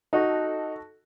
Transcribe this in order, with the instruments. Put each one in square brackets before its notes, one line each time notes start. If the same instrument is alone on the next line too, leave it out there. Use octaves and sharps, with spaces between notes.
[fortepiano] D#4 [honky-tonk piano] F#4 A4